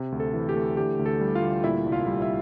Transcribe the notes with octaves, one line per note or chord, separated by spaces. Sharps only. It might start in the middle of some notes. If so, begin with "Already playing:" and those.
Already playing: C3
D2
A4
E3
G4
A3
D3 G4
D2
A4
G3
F4 F5
D2
A#2 E4 E5
C2
F4 F5
G3
E4 E5